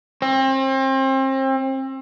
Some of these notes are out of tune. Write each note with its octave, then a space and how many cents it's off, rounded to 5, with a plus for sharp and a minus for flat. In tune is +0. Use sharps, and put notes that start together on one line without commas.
C4 +35